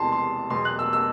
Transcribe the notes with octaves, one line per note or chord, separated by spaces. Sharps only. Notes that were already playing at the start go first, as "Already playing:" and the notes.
Already playing: E1 E2 C3 E3 A5 C6
C6
E2 B2 F#3 C6
F#6
E6
E6